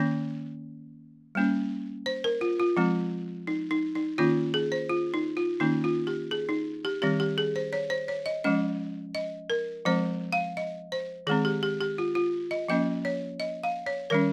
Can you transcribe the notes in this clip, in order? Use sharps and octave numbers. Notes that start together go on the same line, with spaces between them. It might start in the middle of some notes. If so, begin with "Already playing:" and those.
Already playing: D#3 A#3 C#4
G3 A#3 C#4
C5
A#4
F4
F4
F3 G#3 C4
D#4
D#4
D#4
D#3 A#3 C#4 F4
G#4
C5
F4
D#4
F4
D#3 A#3 C#4 D#4
F4
G4
G#4
D#4
G4
D#3 G3 C4 G4
G4
G#4
C5
C#5
C5
C#5
D#5
F3 G#3 C#4 D#5
D#5
A#4
F3 G#3 C4 C5
F5
D#5
C5
D#3 G#3 C4 G#4
G4
G4
G4
F4
F4
D#5
F3 A#3 C#4 D#5
C#5
D#5
F5
C#5
D#3 G3 C#4 A#4